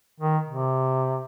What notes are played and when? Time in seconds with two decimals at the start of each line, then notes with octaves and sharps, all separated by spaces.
0.20 D#3
0.48 C3